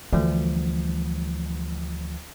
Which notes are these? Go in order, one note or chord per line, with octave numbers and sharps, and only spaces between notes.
D2 E3 F3 G3